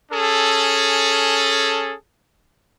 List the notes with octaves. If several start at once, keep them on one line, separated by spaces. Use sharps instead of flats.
C#4 G#4 A4